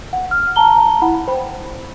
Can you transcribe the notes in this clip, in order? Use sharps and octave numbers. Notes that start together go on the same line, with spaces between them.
F#5
F6
A5 A#5 G7
E4 F#5 B5
C5 G5 B5